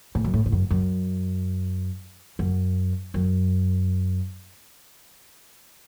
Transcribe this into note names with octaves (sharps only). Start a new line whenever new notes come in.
A2
F#2
A2
A2
F#2
F#2
F#2
F#2